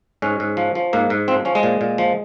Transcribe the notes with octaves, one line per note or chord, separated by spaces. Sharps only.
G#2 C#4
G#2
F3
F3
G#2 A#3
G#2
F3 C4
F3 C#4
G#3
A#2
A#2
F3